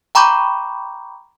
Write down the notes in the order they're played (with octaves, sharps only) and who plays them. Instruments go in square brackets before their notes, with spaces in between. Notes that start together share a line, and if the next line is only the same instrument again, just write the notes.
[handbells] G5 A#5 B5 C#6 D6 G6